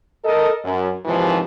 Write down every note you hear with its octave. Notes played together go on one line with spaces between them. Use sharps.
A4 A#4 D#5
F#2
D#2 G#2 C3 E3 F3